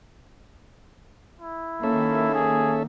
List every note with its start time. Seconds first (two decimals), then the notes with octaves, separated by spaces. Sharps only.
1.40 E4
1.83 D#3 A#3 C#4 A4 E5
2.34 G#4